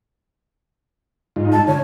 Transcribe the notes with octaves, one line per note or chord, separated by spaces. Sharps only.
G#2 D#4 F4
A5
D3 C#5